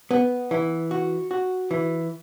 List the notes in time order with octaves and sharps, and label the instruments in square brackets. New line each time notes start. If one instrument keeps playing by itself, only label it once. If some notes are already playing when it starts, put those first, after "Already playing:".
[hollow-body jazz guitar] B3
E3
F#4
F#4
E3